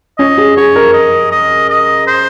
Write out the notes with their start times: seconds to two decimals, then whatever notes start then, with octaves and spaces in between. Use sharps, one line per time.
0.19 C#4 D#5
0.38 G#4
0.57 G#4 C#5
0.76 A#4
0.94 D#5
1.32 D#5
1.69 D#5
2.07 C5